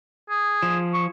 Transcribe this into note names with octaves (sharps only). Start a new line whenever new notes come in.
G#4
F3
C#6